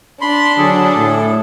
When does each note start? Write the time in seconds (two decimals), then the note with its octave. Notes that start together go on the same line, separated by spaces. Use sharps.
0.21 D4 B5 C6
0.58 D3 F#3 G#4 A4
0.96 A2